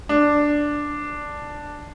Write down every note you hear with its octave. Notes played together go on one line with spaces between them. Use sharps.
D4